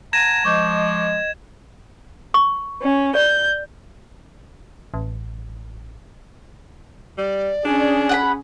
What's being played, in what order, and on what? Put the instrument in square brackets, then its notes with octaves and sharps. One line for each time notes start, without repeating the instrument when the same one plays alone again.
[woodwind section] F#5 A5 A#5 [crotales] G#6 E7 [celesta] A#6 D#7
[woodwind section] F3 G#3 [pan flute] D#5 [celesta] C#6 D6 G6
[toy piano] C#6
[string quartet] C#4
[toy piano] D5 [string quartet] G6
[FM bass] A1
[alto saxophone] G3 [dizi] D5
[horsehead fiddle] C#4 G#4 [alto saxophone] D4
[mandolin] F#5 G5 B5